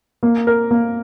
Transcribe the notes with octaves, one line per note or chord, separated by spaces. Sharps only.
A#3
A#4
A#3